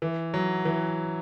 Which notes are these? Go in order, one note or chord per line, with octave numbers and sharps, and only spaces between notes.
E3
F#3
E3